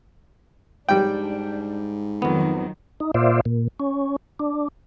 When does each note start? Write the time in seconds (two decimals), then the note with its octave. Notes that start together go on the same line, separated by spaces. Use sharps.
0.89 G#2 G3 D4 G5
2.22 F2 D#3 F3 F#3 B3
3.00 D#4
3.14 A#2 F4 C5 D5 E5
3.45 A#2
3.80 C#4
4.39 D4